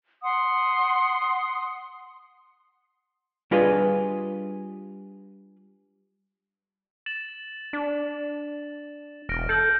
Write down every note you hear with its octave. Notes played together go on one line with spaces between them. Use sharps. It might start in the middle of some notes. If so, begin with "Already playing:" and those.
F#5 C6 D#6
G3 D4 F4 G#4 B4 D#5
A6 E7 F#7
D4
E1 F6 A#6 D7
A4 G6 F#7